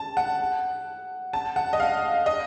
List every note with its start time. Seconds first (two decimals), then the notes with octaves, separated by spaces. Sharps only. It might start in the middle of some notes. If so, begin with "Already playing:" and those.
Already playing: A5
0.17 F#5
1.33 A5
1.56 F#5
1.73 D#5
1.80 F5
2.26 D#5